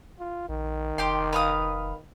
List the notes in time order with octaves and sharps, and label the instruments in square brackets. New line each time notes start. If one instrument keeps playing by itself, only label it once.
[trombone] F4
[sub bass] A#1 [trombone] D#3
[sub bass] F1 [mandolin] G4 G5 C6
[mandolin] B4 F5 D#6